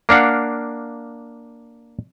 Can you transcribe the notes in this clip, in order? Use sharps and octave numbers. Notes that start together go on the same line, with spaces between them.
A#3 D4 F5 F#5